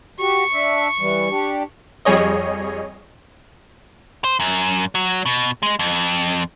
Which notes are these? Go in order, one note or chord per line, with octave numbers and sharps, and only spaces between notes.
F#4 G4 C#6
D4 E5
E3 G3
D4 G4
F2 G3 G#4 C#5 D#5
C5
F#2
F#3
B2
G#3
F2